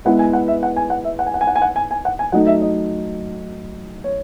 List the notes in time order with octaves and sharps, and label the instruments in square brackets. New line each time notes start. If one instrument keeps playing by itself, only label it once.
[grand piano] G#3 B3 E4 B4 [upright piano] F#5
[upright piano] G#5
F#5
E5
F#5
G#5
F#5
E5
F#5
G#5
F#5
G#5
F#5
G#5
F#5
G#5
G#5
F#5
G#5
[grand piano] F#3 A3 D#4 [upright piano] F#5
[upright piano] E5
D#5
C#5